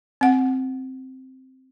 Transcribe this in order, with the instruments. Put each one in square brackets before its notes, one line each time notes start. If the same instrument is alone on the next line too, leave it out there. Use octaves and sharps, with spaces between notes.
[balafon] C4 F#5